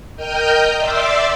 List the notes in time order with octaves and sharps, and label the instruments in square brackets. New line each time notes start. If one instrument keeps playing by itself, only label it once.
[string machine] A#4 D#5 G5 D#6 F6 G6
D5 E5 C6 D6 E6